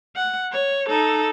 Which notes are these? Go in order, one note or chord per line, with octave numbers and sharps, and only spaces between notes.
F#5
C#5
D#4 A4